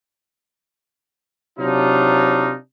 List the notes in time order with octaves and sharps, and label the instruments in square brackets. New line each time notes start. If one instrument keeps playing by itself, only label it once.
[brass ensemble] C3 F#3 D4 D#4 F4